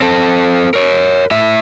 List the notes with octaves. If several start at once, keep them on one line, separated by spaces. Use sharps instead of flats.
C4 A4
A#4 C#5
A2 E5